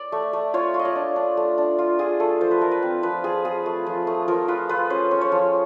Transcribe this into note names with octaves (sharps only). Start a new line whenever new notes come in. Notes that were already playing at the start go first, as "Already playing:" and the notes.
Already playing: D5
A3
A3
F4 C#5
F4
D#5
D5
D4
D4
A3
D4
F4
F4 G#4
A3 A4
F3 C5
B4
A3 A#4
B4
C4
F3 B4
F4 G#4
F4 G#4
A3
F3
A3
F3 A#4
F4 B4
F4 B4
C#4 C5
C#4
C#5
F3